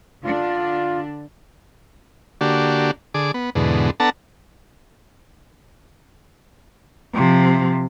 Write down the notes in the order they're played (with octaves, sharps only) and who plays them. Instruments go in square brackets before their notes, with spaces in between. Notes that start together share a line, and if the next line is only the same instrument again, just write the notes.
[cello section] D3 D4 [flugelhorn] F4
[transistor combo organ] D3 A#3 D4 F#4 G4
D3 G#4 D6
B3
E2 G#2 B2 D3
B3 D4 A4 F#5 A5 A#5
[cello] C3 F3